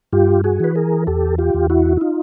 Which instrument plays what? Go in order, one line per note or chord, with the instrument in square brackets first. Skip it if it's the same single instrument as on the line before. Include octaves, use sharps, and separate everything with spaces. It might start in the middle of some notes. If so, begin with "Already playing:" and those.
[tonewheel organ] G2 F4 G4
F#4 G#4
E3 B4
G#4 A#4
E2 G4 A4
F4 G4
E2
E4 F#4
E4
D#4 F4